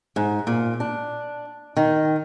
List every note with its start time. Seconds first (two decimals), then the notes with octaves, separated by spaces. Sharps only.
0.16 G#2
0.47 A#2
0.80 D4
1.77 D#3